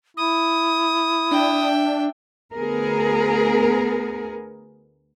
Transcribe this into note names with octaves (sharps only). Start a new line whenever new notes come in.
E4 D#6
D4 E5 G5
D2 B3 G#4 A#4